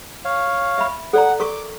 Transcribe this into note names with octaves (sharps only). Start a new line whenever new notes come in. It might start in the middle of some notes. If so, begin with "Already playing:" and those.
C#5 F5
E5 B5
A4 D5 F#5 A#5
A#4 C#6 D6